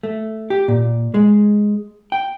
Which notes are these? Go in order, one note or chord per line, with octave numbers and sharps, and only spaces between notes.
A3
G4
A#2
G#3
G5